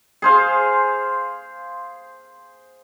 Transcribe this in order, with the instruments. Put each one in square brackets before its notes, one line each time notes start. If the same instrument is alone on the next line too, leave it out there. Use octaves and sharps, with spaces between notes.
[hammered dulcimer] G#4 C5 F5